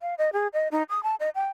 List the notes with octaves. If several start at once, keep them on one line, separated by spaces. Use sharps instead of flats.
F5
D#5
G#4
D#5
D#4
D#6
A5
D#5
G5